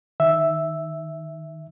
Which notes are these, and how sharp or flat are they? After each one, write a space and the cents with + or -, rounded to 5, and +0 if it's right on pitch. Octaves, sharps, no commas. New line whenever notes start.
D#3 +0 E5 +0